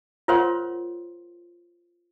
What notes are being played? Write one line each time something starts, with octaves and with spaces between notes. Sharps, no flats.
F4 A#4 C5 C#5 F#5 C6